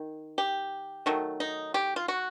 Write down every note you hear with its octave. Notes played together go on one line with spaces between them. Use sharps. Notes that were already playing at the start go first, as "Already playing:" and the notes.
Already playing: D#3
G4
D#3 F#3 A3
D#4
G4
F4
F#4